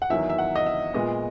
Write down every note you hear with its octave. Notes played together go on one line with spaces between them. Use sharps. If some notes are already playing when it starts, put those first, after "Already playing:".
F#5
E2 D#3 F#3 E5
E5
F#5
D#5
E5
A#2 G#3 B3 D#5